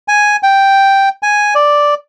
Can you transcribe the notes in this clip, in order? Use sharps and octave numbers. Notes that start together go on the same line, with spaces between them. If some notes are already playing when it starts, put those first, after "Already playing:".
G#5
G5
G#5
D5